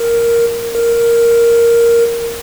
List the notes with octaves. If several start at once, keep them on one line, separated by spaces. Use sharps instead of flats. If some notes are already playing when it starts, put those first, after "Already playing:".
Already playing: A#4
A#4